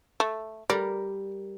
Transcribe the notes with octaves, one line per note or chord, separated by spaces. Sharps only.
A3
G3 A#4 D5